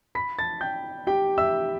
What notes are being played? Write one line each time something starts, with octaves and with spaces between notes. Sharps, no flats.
B5 B6
A5 A6
G5 G6
G4 G5
E5 E6